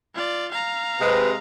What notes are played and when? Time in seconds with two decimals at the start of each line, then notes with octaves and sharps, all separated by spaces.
0.14 F4 D5
0.52 F5 A#5
1.00 C3 G#3 B4